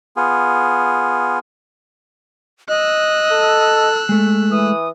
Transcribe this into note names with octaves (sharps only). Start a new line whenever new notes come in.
B3 F4 G#4
D#5 E6 F#6
A4
G#3 A3
E3 D#6